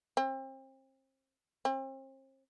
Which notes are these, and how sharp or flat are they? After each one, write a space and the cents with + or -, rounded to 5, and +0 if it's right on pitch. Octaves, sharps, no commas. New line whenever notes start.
C4 +35
C4 +40